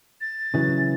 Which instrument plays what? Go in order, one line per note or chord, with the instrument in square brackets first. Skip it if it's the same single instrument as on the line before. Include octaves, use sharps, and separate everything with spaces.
[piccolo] A6
[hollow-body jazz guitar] C#3 E3 F#3